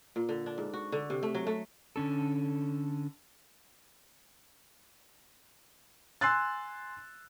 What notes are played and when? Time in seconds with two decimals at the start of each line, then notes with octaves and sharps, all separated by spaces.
0.16 A#2
0.29 D3
0.46 D4
0.58 G#2
0.73 F#4
0.92 D3
1.10 C3
1.23 A3
1.35 F#3
1.47 A3
1.96 D3 C#4 A4
6.21 G#5 C6 E6 F#6 A6